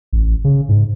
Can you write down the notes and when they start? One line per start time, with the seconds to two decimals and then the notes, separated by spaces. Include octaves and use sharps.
0.13 A1
0.44 C#3
0.69 G#2